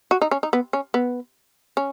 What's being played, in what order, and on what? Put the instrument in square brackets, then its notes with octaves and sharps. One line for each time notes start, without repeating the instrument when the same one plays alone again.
[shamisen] F#4
D#4
C#4
D#4
B3
C#4
B3
C#4